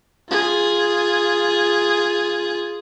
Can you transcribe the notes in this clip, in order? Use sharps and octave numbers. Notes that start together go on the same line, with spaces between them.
F4 G#4